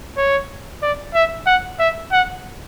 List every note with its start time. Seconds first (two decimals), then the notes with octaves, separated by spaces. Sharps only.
0.17 C#5
0.83 D5
1.15 E5
1.47 F#5
1.79 E5
2.12 F#5